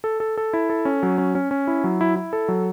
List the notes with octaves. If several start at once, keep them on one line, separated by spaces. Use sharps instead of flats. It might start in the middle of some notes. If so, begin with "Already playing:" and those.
A4
A4
A4
E4
A4
C#4
F#3
C#4
C#4
C#4
E4
F#3
E4
E4
A4
F#3